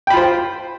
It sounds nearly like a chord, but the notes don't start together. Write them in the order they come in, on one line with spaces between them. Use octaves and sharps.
G5 B5 F4 C5